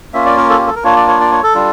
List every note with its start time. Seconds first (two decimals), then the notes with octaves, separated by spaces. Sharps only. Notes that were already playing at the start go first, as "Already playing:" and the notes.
0.13 A#3 C#4 F4 E5
0.26 D5
0.37 A#4
0.49 A4
0.58 G4
0.67 A4
0.76 A#4
0.84 A#3 D4 F4 C#5
0.96 D5
1.08 C#5
1.20 D5
1.32 C#5
1.43 A4
1.55 G3 D4 F4